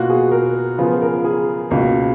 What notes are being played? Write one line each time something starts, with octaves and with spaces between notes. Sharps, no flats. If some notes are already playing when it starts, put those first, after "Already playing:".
Already playing: B2 A#3 F4 F#4
G#4
A#4
C#3 F3 B3 F4 G#4
A#4
G#4
C#2 B2 A#3